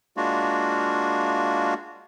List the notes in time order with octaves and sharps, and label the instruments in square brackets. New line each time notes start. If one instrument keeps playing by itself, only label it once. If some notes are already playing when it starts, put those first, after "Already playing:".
[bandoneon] G#3 A#3 D4 F4 F#4